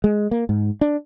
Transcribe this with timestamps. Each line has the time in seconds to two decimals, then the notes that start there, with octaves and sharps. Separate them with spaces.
0.04 G#3
0.31 A#3
0.49 G#2
0.81 D4